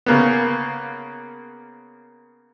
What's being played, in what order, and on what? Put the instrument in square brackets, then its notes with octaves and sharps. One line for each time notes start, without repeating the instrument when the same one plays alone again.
[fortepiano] C#3 A#3 B3